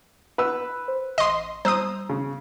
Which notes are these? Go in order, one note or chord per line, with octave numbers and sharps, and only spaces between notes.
B4 F#5 E6
C5
A1 D#5 C6
G3 C5 A#5 D#6 E6
C#3